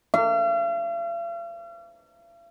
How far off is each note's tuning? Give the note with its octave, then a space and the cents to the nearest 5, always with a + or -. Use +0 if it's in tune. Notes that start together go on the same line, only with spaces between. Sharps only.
F5 -45